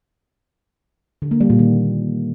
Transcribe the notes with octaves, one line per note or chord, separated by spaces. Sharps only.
D3
A#3
G3
A#2
D#3